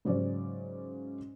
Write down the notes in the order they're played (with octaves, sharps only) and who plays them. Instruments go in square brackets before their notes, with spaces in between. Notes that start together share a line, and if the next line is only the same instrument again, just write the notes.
[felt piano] G#2 C#3 F#3 C#4 D5